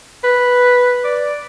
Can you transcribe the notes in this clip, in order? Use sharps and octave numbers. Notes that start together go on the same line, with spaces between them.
B4
D5